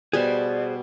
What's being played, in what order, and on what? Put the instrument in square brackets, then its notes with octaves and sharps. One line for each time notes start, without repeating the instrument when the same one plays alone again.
[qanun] B2 G3 G#5 [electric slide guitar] G#4 B4 C5 [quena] D5